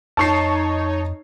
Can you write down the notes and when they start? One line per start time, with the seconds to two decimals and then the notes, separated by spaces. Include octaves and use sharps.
0.17 F2 D#4 C#5 A5 C#6 C7